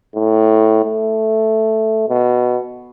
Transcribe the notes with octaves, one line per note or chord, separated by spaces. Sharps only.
A2
A3
B2